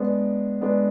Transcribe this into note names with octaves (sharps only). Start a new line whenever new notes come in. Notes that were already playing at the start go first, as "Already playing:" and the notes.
Already playing: G#3 B3 D4
G#3 B3 D4